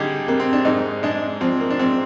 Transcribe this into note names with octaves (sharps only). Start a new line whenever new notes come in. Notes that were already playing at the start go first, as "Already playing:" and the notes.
Already playing: D3 G3 D#4 G4 G#4
F2 A#3
C4
D4
G#2 D#4
G#3 D4
F3 C4
A#3
D4
G#2 C4